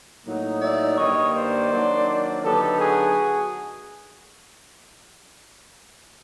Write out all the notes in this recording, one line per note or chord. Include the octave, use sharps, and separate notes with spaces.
A2 F#3 A#3 D#4
D5 E5
G2 D#3 G3 A#3 C#5 D#5
C5 D5
D#3 F#3 A#3 D4
D3 F#3 B3 D#4 G4 A4
F#4 G#4